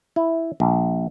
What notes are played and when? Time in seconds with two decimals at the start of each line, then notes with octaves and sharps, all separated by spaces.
0.16 E4
0.60 A#1